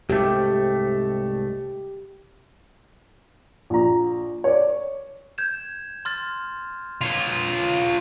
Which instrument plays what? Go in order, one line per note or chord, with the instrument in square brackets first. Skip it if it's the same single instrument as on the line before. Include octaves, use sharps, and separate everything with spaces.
[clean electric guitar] C2 G#2 A3 [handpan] G4
[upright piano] A#1 A#5
C#5 D5
[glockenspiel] G6 G#6 E7
C6 F6 A6
[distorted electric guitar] F4 C#5